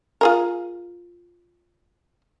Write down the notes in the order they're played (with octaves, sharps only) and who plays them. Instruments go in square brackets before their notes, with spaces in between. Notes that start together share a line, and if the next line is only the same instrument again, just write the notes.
[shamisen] F4 G#4 A#4